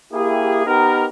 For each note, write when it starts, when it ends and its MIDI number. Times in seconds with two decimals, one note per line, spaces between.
0.13 0.64 58
0.13 0.64 64
0.13 0.64 67
0.13 0.64 68
0.66 1.07 59
0.66 1.07 63
0.66 1.07 67
0.66 1.07 70